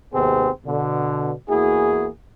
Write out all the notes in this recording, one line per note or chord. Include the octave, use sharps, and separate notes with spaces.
G#1 D#2 C3 B3 C4 G#4
B2 D3
E2 A#3 E4 F#4 G#4